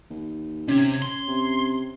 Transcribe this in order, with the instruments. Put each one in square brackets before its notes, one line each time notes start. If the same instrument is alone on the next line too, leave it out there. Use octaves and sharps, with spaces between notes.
[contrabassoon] D#2
[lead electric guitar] C3 [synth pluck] C#4 G#6
[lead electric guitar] C6
[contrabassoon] C3